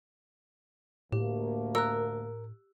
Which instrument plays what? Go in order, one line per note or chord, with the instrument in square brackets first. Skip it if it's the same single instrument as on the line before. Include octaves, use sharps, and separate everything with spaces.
[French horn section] D2 A3 A#3 [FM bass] A2 [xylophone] G4
[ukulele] A#4 [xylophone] E6 F#6